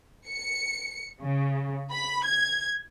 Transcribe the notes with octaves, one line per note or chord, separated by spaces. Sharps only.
C#7
C#3
B5
G#6